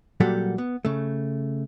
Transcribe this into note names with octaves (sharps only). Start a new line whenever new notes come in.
A#2 F#3 G3 G4 A4 F#5
B3
C#3 A3